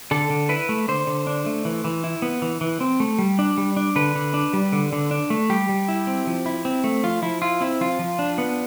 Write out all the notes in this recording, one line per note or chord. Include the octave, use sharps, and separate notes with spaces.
D3 A4
D3
E4 B4
A3
D3 C5
D3
D4
A3
E3
E3
E4
B3
E3
E3
C4
A3
G3
D4
G3
D4
D3 B4
D3
D4
G3
D3
D3
D4
A3
G3 G4
G3
E4
C4
F3
E4
C4
A3
F3 F4
F3 E4
E4 F4
C4 E4
F3 F4
F3
D4
B3